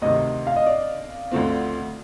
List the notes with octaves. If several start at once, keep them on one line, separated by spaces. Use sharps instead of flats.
D2 C3 D#3 D#5
F5
D#5
D5
D2 D3 F3 C4